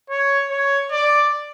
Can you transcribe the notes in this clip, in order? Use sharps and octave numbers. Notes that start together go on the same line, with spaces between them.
C#5
C#5
D5